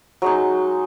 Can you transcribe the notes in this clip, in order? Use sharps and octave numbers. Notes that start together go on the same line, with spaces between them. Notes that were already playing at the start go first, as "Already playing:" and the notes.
F#3 G#3 D#4